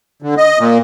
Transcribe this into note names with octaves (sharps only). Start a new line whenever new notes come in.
D3
D#5
A#2